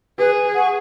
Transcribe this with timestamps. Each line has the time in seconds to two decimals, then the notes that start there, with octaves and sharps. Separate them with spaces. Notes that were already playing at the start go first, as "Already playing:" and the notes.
0.19 G#4 B4
0.54 F#5 C#6